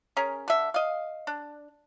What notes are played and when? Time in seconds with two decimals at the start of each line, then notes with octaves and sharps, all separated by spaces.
0.17 C#4 G#4 A#4
0.48 D3 E5
0.74 D#5 F5
1.27 D4